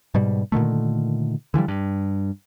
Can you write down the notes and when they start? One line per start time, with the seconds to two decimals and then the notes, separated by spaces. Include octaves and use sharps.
0.14 G#2 B2 G3
0.52 A#2 D3 D#3 A3
1.54 D3 E3 F3 G3
1.68 G2